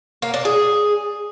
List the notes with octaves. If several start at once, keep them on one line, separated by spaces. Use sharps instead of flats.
A#3
D4
G#4